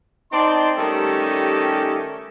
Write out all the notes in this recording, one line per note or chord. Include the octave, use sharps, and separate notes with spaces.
C4 D#4 D5 A5 C6
D#3 G3 A3 C#4 G4 A4